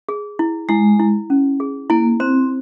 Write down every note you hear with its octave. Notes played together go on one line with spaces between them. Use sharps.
G#4
E4
G#3 E4
E4
C#4
G#4
A#3 E4
C4 C5